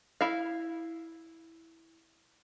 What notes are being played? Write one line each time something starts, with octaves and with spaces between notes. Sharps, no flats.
E4 F5